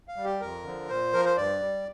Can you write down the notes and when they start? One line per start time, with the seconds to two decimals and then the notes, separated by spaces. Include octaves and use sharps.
0.08 F5
0.16 G3
0.24 G4
0.41 F2 A#4
0.64 D3 F3
0.89 A#2 C5
1.13 F3 A#4
1.25 C5
1.37 G2 D5
1.61 G3